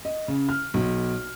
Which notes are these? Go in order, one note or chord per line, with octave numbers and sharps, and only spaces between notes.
D#5
C#3
F6
B1